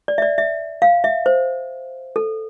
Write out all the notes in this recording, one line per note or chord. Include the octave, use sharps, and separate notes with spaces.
D5
E5
D5
E5
F5
E5
C5
A4